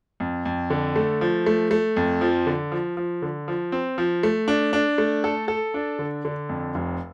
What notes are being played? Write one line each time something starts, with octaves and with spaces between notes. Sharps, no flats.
F2
F2
D3
A3
F3
A3
A3
F2
F3
D3
F3
F3
D3
F3
C4
F3
A3
D4
D4
A3
A4
A4
D4
D3
D3
F2
F1